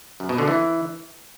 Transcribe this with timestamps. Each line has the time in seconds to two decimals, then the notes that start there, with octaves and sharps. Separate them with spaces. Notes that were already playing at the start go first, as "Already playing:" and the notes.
0.20 F#2
0.29 B2
0.38 D3
0.48 E3